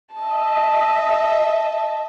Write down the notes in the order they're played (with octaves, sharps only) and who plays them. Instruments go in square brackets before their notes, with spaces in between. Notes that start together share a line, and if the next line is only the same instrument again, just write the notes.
[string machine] D#5 E5 [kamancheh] A5